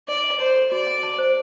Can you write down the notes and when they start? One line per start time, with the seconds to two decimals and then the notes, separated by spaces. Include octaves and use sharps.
0.08 D#4 D5
0.24 D#5
0.40 C5 A5
0.55 A4
0.71 F#4 D5
0.87 F#5
1.03 A5
1.18 C5